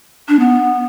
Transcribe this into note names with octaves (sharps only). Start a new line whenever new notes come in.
D4
B3